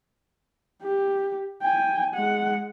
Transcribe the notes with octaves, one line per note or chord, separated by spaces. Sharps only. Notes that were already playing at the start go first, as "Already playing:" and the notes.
G4
G5 G#5
G#3 F#5